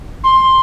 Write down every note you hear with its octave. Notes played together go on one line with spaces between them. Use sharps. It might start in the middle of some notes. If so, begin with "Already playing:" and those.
C6